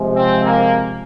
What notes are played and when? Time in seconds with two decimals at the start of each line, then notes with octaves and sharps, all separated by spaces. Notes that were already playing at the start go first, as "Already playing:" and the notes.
Already playing: C3 F3 G#3
0.16 C4
0.44 A#3